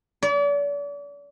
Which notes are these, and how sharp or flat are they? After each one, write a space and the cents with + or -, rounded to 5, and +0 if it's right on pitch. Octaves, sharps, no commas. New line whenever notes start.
D5 -40